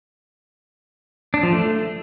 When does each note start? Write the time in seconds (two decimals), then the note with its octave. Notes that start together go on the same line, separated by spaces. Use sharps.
1.34 D4
1.43 F3
1.52 A3